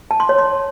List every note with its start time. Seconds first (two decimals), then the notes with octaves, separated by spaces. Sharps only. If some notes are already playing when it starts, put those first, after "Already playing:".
0.11 A5
0.20 C6
0.29 C#5
0.39 C6